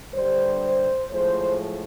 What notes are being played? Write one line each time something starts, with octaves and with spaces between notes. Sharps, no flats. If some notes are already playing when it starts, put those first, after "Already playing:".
G2 D3 G3 C5
A2 F3 G#3 C5